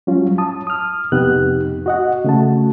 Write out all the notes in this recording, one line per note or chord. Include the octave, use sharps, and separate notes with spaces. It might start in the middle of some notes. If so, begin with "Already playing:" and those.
F#3 G3 C#4 F4
A5 D#6
D#6 F6
F2 C3 B3 D#4 G4 F#6
F#4 D#5 F#5
C#3 A3 F#4 A5